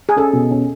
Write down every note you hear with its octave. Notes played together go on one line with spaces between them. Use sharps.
G#4
C#4 A4
B2
C#4